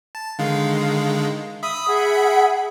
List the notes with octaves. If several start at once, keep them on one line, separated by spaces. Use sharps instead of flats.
A5
D3 D#3 G#3 F5
E5 B5 D#6
G#4 F#5